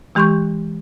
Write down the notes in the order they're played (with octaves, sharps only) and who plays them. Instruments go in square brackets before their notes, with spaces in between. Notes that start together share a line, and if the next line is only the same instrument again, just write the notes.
[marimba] E3 G#3 G4 C6 C#6 G6